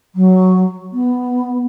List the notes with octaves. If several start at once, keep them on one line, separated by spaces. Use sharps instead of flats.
F#3
B3